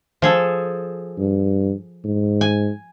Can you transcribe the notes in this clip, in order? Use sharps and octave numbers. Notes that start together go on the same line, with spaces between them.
F3 G#4 A4
G2
G#2
G#5